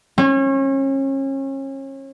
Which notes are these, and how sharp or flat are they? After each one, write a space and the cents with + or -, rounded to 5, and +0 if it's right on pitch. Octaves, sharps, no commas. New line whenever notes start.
C#4 -35